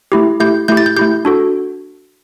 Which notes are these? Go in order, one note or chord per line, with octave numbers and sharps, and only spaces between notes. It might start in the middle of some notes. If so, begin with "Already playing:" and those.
A3 E4 G4
A3 E4 G4 G6
A3 E4 G4 G6
A6
G6
A3 E4 G4 G6
D4 F#4 A4